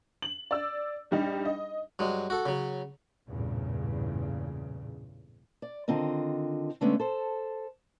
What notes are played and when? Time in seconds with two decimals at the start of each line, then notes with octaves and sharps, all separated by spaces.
0.22 F#7
0.51 D5 E6
1.11 A#1 G3 D#4
1.45 D#5
1.99 G2 F#3 G#3
2.30 F#4 A4
2.46 C#3 F#3
3.27 A1 E2 G2 A#2 C#3
5.62 D5
5.88 D3 D#3 C4 F4 D#5
6.81 D3 G#3 A3 B3 C#4 D4
7.00 A4 C5